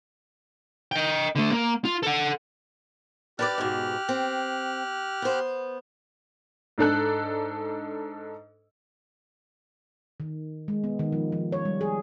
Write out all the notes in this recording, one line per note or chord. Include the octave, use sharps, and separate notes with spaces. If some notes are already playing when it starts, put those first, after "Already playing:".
D#5 G5
D3 A3
A#3
F4
A4 F#5
D4 G4 B4 D5 F6 F#6
G#2 B2
C4
B3 C5
G#2 D4 A4 F#6
D#3
G#3
B3
D#3
F3
F3
C#5
G3
G#4